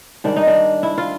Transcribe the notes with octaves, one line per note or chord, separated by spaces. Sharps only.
G#2 D#3 G3 D4
D#4
D4
E4
F4